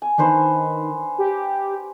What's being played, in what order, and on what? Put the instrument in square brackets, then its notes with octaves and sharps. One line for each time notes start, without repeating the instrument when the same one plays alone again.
[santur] G#5
[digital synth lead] D#3 [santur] D4 B4 C5
[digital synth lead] G4